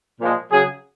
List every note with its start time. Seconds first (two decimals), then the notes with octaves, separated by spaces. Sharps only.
0.19 A#2 F3 G#3
0.51 C#3 F#3 G#4